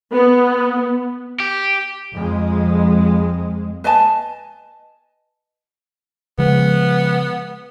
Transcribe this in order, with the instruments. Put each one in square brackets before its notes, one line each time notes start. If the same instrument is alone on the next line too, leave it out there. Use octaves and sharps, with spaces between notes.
[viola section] B3
[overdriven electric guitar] G4
[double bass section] F2 G#3
[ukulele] B4 D#5 G#5 A5
[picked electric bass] C#3 F3 G#3 [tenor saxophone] B3